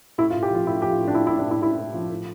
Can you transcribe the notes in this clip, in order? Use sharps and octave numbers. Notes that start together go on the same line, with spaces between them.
A2 E4
F4
A2
G4
F3 F4
A2 E4
F3 G4
F4
A2
D4
A2 E4
E4
A2
D4
A2 E4
A2 E4
A2
F3
A2